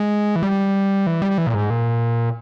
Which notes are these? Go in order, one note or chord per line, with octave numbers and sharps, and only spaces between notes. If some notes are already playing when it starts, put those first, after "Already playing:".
Already playing: G#3
E3
G3
E3
G3
E3
A#2
G#2
A#2